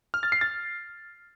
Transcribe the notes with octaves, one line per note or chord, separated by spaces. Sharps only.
F6
A6
C7
A6